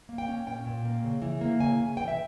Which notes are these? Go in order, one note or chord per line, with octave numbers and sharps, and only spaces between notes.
A#3
G5
C#4
A#2 G5
A#2
A#3
C#3
E3
A#3
C#3 G#5
C#3
E3 G5
E5